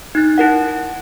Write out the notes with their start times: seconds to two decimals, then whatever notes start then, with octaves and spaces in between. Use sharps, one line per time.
0.15 D#4 F#6 A6
0.38 E4 A#4 F#5